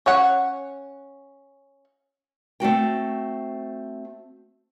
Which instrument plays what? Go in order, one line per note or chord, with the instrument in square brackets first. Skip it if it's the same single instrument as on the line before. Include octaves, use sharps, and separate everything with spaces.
[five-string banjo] C#4 C#5 F#5
[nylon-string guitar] A3 C4 F#4 G5